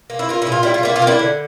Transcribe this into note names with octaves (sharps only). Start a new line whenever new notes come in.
A#3
E4
A#3 F4
E4
A#2
F4
G3 E4
F4
A#3 E4
F4
A#3
D4 E4
D3